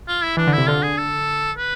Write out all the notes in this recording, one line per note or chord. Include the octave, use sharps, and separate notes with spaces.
F4
E4
E3 D4
D3
E4
C3
D3 F4
G#4
A4
B4